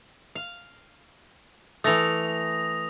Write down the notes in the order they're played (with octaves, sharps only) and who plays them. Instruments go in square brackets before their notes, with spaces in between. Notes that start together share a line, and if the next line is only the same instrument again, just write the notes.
[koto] F5
[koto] E3 A3 [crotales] D#6 A#6 F7